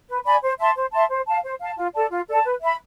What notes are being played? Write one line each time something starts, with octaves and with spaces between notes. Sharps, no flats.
B4
D5 G#5 B5
C5
E5 A5 C6
C5
E5 A5 C6
C5
F5 A5
C5
F5 A5
F4
A4 D5 A5
F4
A4 D5 A5
B4
E5 B5